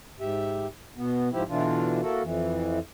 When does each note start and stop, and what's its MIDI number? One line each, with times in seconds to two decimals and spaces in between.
0.20 0.67 44
0.20 0.67 67
0.20 0.67 76
0.97 1.29 47
0.97 1.29 59
1.32 1.43 44
1.32 1.43 53
1.32 1.43 64
1.32 1.43 67
1.49 2.01 47
1.49 2.01 50
1.49 2.01 52
1.49 2.01 62
1.49 2.01 65
2.02 2.22 58
2.02 2.22 64
2.02 2.22 66
2.02 2.22 69
2.22 2.79 41
2.22 2.79 52